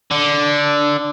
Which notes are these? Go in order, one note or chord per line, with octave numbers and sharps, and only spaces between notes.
D3